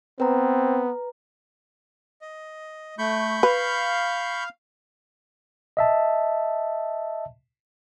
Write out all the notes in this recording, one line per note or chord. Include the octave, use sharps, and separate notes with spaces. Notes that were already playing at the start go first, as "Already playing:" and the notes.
B3 C4 B4 A#5
D#5
A3 B5 C#6 G6
B4 F5
D#5 E5 A5